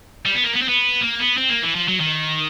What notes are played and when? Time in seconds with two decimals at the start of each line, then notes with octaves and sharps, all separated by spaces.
0.26 G3
0.35 B3
0.44 A#3
0.53 B3
0.61 C4
0.68 B3
1.01 A#3
1.20 B3
1.38 C4
1.50 A#3
1.63 E3
1.75 F3
1.88 F#3
2.00 D#3